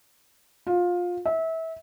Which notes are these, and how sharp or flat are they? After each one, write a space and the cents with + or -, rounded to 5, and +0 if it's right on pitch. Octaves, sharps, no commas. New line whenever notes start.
F4 +20
E5 -25